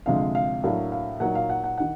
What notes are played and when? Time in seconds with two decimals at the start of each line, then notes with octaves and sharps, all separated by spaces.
0.06 D2 C3 F3 G#3 F5
0.35 F5
0.64 A2 F#3 A#3 D4 F5
0.92 F5
1.20 A#2 F#3 A#3 D#4 F#5
1.35 F5
1.50 F#5
1.64 F#5
1.78 D#3 F#5